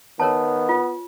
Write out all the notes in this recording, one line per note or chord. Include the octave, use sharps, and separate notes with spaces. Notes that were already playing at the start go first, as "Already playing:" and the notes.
D#3 B3 A#4 C#5 A5
F4